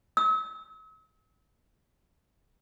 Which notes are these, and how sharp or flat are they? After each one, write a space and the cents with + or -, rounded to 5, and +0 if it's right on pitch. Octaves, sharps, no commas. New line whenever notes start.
E6 -45